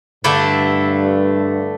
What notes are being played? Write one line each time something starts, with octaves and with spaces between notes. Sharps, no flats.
G2 D3 A3 E4